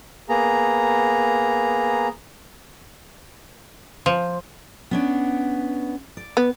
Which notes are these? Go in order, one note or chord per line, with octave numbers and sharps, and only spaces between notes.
A#3 B3 G#4 A#5
F3
B3 C#4 D4
D5
B3